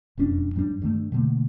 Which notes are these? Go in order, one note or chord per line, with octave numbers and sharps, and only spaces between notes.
E1 F2 C#4 D4
F#2 G3 D4
G2 D#3 A3
B2 D3 A3 A#3